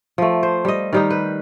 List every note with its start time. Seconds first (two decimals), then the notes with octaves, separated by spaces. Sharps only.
0.18 F3 A3
0.43 C5
0.65 G3 D#5
0.93 D#3 G3 D#4
1.10 B4